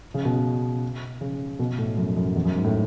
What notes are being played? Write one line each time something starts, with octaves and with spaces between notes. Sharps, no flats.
C#3
B2
C#3
B2
A2
F#2
F#2
E2
F#2
G#2
A2